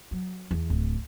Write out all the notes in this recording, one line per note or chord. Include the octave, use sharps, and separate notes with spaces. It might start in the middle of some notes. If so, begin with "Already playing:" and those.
F#3
E2
D1